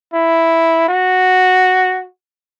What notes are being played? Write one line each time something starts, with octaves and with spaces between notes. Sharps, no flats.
E4
F#4